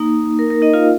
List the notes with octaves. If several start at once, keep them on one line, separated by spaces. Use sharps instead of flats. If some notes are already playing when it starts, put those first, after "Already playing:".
Already playing: A#3 D#4
A#4
A#4
D#4 D#5
F4 F5